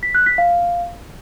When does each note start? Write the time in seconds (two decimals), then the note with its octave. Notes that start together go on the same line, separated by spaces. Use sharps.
0.03 B6
0.15 F#6
0.26 B6
0.38 F5